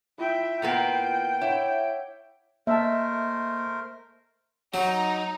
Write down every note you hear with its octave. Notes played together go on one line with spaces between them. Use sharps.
E4 F4 E5 G5 B5
A#2 A#3 B3 G5
E4 C#5 F#5 D6
A3 A#3 A#4 C5 D#5 E5 A5
F#3 D#4